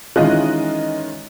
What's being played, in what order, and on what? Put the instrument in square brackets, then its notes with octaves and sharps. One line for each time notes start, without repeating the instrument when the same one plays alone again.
[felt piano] D#3 E3 C#4 [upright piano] G#3 F4 [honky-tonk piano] D#5 F#6